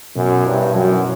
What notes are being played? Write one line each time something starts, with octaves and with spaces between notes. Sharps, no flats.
F#2 B2
G2 E4
F#2 F#3